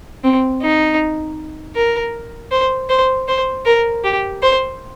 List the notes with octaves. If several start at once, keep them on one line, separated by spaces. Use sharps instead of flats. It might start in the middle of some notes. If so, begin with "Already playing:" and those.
C4
D#4
A#4
C5
C5
C5
A#4
G4
C5